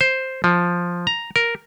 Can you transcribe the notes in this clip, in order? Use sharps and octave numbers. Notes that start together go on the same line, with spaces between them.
C5
F3
A#5
A#4